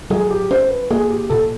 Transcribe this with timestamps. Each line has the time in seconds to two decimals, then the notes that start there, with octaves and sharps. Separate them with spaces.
0.10 F#3 G#4
0.31 G4
0.51 C#4 C5
0.70 B4
0.90 A#3 G#4
1.10 G4
1.30 A#2 A4